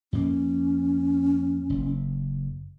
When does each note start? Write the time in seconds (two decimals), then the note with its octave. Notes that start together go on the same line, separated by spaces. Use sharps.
0.13 F2 A#3 C#4
1.70 F#1